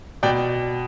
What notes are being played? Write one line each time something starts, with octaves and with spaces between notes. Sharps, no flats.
B2 D5 G5